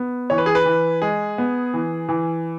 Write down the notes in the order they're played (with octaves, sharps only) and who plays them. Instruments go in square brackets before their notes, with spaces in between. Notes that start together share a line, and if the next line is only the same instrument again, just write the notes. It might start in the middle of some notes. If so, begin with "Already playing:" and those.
Already playing: [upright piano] B3
E3 C#5
B4
G#4
B4
E3
G#3 G#4
B3
E3
E3